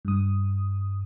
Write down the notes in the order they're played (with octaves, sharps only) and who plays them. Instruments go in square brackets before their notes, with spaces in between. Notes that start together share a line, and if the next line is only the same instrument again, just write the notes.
[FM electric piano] G2 D#6